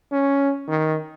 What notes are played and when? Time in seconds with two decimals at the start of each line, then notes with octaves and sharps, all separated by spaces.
0.12 C#4
0.68 D#3